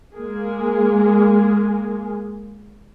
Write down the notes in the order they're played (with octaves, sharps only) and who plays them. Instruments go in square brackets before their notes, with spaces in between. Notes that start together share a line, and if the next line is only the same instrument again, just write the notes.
[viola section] G#3 A#3 G#4